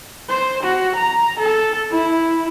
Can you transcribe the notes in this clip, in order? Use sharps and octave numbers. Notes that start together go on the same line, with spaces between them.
C5
F#4
A#5
A4
E4